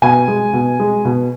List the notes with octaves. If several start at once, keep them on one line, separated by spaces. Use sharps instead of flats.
B2 G#5
G#3
B2
G#3
B2